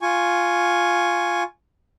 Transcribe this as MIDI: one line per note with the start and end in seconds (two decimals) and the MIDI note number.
0.02 1.43 65
0.02 1.43 80
0.02 1.43 85